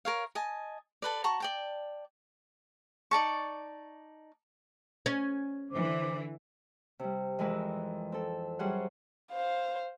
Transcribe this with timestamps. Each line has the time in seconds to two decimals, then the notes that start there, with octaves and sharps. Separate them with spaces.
0.05 A#4 C#5 F5
0.35 D#5 G#5 A5
1.02 A4 B4 D5
1.24 F#4 A5 A#5 C#6
1.40 D5 G5 A5
3.11 D#4 D5 A5 C#6
5.06 C#4
5.71 D3 E3 C5 D6
6.99 C3 G3
7.39 F2 E3 G#3 A#4 B4 E6
8.12 C4 A4
8.59 F#2 G3 G#4 C5 F#5
9.32 C5 F5